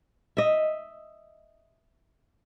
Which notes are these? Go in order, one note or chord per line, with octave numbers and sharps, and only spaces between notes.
D#5 E5